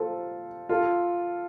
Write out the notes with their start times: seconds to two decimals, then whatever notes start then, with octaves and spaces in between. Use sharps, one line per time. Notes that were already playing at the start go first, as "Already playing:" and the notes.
Already playing: F4 A4 C5
0.69 F4 A4